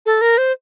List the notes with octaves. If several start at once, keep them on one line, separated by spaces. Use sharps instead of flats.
A4
A#4
C5